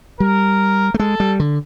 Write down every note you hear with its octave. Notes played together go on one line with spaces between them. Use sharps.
G3 A#4
A3
G#3 A4
G3
D3